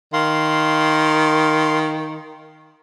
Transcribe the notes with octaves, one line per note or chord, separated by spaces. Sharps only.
D#3 F5 C6